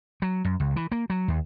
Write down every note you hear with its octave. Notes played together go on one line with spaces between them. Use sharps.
F#3
F#2
C#2
E3
A#3
F#3
D#2